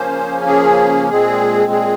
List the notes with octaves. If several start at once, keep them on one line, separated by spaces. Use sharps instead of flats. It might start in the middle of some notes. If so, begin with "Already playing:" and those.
Already playing: C#3 F3 A#3 C#4 C5
G#4
A#2 G#3 C4 G#4
G#4